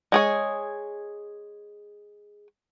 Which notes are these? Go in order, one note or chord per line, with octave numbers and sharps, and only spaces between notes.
G#3 G#4 C#5